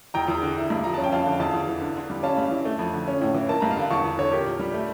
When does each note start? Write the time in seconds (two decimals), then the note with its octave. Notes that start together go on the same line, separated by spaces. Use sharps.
0.14 E2 G5 A#5
0.28 E2
0.42 D3
0.57 E4
0.70 G2
0.84 F3 A#5
0.94 C#4 A5
1.04 G5
1.12 F2 F5 A5
1.26 D3
1.40 E2 F5 A5
1.53 E2
1.67 E3
1.81 D3
1.96 D3
2.10 G3
2.23 C#4 F5 A5
2.37 G2
2.51 E3
2.65 A3
2.79 F2
2.94 D3
3.08 C#4
3.21 A2
3.34 E3
3.49 A#3 A5
3.60 G2 A#5
3.71 F5 A5
3.77 D3
3.91 E2 A5 C#6
4.04 E2
4.18 D3 A4 C#5
4.32 A#2 G4 A#4
4.46 A#2
4.59 G3
4.74 A3